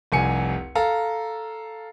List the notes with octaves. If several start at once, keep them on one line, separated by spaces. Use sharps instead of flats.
F1 C2 G#5 C#7
A4 F5 A#5